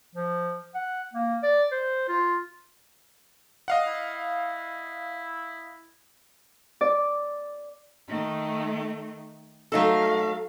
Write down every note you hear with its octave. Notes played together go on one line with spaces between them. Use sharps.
F3
F#5
A#3
D5
C5
F4
D#5 F5 F#5
E4
D5
D#3 A3
F#3 A3 D#4 A4 F5